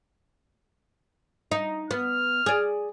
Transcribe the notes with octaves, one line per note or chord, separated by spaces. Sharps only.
D#4
B3 F6
G#4 D5